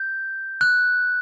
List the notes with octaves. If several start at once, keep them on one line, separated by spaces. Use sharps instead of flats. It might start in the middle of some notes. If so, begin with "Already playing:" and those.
Already playing: G6
F#6